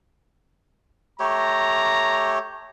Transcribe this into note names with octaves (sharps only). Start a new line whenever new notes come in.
A3 G4 C#5 A#5